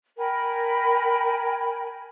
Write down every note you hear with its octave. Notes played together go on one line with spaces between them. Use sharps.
A#4 G5 G#5 B5